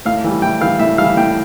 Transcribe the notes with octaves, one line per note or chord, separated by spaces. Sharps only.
A2 F5
E3 G3
A2 G5
E3 G3 F5
A2 E5
E3 G3 F5
A2 G5